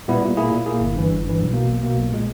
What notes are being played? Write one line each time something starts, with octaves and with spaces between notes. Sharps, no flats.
A#2 G3 B3 E4
A#2
A#3 E4 G#4
A#2
A#3 E4 G#4
G1
G2 E3
G1
G2 E3
B1
B2 A#3
B1
B2 A#3
B1
A#2 G#3